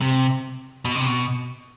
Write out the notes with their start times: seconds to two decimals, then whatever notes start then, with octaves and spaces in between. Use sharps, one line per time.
0.01 C3
0.85 B2
0.95 C3
1.06 B2